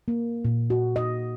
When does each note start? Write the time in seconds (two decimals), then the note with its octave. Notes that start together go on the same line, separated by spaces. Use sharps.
0.08 A#3
0.45 A#2
0.70 F#4
0.96 D#5